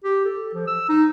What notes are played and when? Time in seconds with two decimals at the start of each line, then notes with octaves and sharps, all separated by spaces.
0.04 G4
0.25 A4
0.53 F3
0.67 E6
0.89 D#4